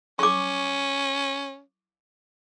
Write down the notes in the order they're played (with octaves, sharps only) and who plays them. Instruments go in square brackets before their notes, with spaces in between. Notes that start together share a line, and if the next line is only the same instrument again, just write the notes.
[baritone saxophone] C#4 [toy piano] C#6 D6